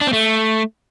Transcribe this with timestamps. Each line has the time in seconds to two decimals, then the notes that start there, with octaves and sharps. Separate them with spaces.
0.01 D4
0.07 C4
0.13 A3